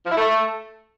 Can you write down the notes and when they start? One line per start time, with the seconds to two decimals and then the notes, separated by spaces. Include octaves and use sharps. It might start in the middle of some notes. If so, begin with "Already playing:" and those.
0.05 F3
0.11 E4
0.17 A3